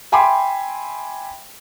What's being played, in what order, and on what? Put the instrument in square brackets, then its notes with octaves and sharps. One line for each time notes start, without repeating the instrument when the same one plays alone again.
[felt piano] E5 G5 G#5 B5 C6 D6